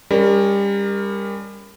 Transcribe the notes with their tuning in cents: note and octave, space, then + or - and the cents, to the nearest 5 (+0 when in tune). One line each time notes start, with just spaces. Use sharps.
G3 +30 C#4 +25 A#4 +0